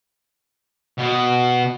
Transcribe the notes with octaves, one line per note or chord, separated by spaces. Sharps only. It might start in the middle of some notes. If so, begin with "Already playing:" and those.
B2